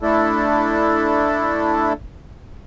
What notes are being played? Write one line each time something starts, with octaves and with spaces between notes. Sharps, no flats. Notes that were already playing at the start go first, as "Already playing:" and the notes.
A3 D4 E4 A4